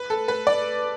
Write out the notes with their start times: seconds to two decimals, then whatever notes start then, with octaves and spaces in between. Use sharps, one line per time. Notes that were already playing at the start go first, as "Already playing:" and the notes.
Already playing: B4
0.10 A4
0.28 B4
0.47 D5